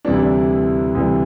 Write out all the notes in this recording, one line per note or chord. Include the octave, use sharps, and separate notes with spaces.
D2 C3 E3 G3 D4
E4
D4
D2 C3 E3 G3